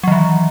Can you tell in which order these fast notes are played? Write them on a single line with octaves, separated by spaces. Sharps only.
F#3 D#3 E3